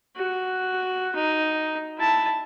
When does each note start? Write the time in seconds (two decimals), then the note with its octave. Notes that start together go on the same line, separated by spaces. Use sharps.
0.16 F#4
1.15 D#4
1.98 E4 A5